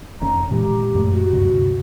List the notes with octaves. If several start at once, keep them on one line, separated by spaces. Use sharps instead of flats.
F1 D#3 C#4 A#5
A#2 E3 G#3 G4
F#2 A#2 A3
F#4
D2 G2 C3